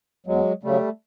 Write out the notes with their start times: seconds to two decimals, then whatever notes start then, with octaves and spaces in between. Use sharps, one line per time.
0.26 E2 F#3 G#3
0.63 C#3 F#3 G3 A3